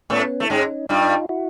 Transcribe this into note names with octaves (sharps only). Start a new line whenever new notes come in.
A2 A3 B3 C#4
A3 E4
G#2 G#3 C#4 D#4
G2 G3 D#4 F4
E4 F#4